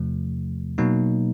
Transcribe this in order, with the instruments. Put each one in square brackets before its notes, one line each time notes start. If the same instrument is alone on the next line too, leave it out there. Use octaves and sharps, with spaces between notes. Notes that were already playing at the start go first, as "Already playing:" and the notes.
Already playing: [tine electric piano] E2 C3 F3 A3
B2 F#3 A#3 D#4